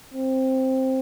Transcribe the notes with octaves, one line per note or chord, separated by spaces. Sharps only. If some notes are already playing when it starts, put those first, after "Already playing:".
C4